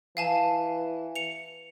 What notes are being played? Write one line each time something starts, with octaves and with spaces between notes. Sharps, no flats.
E3 F5 G#5 A5
C#7 F7